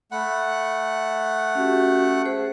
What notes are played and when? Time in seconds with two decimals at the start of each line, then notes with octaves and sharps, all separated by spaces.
0.12 A3 F#5 B5
1.55 C#4 F#4 G4
2.26 G#4 C5